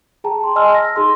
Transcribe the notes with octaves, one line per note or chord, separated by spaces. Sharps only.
G#4 G5 A5 A#5
C6
D#5 G#5 A5 C6 E6 F6
E6 A#6
D#4 G#4 C6